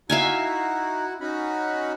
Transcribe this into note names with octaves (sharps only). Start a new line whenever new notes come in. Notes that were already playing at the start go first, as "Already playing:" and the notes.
D#4 E4 F#4 E5 F5 G#5
C#4 D#4 F#4 B5